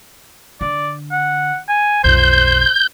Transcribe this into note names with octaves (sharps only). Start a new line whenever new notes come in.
D3 D5
F#5
G#5
B1 F2 C5 G6